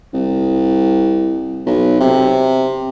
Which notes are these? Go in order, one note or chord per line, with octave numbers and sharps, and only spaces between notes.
C2
B1
C3